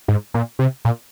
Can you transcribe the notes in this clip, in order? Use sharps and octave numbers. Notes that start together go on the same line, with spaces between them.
G#2
A#2
C3
A#2